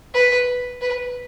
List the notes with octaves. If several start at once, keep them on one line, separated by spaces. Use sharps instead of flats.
B4
B4